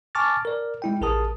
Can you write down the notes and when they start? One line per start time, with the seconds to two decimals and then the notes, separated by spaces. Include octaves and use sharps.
0.15 G#5 A5 C#6 D6 F6 A6
0.45 A#4 D5
0.82 G#3 E4 G5
1.01 A1 G#4 A#4 A5 D#6